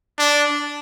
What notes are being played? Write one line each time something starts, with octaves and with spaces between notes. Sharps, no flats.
D4